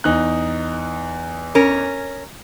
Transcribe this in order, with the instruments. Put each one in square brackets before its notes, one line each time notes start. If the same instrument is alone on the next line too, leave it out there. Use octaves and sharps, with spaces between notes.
[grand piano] E2 D#4 F#6
[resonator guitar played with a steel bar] C#4 A#4